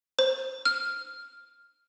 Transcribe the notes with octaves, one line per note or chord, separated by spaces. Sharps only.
C5
F6